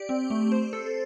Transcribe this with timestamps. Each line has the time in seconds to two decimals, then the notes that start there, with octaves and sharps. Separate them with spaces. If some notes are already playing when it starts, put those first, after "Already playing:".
Already playing: G4 D5
0.09 C4
0.30 A3
0.52 C5
0.73 A4